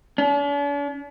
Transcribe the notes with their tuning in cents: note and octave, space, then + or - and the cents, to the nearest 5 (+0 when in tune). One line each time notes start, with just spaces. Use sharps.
D4 -45